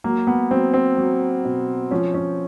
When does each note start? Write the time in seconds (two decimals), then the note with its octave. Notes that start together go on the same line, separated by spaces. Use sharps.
0.04 F#3 A#3
0.27 B3
0.51 F#3 C4
0.74 C4
0.97 F#3
1.45 B2
1.91 F3 C#4
2.14 C#4